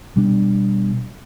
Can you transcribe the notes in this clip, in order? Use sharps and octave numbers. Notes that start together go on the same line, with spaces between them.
B2 G3 B3 D4